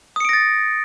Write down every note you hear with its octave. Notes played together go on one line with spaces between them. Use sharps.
D#6 A6 A#6 C#7 D7